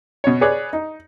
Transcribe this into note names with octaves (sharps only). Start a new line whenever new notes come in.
B2 C#5
G#4 B4 C#5 D5
D#4